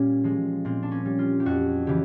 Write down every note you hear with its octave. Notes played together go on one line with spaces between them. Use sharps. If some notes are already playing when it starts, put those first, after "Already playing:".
Already playing: A#2 G3 C#4
F3 G#3
A#2 C4
D4
C#4
G3
F4
G4
F2 F#4
C#3 E3 G4